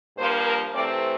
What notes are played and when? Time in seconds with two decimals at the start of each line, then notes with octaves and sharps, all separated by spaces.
0.17 G2 F3 A#3 C5
0.46 A#4
0.74 C3 E3 A3 C4 D5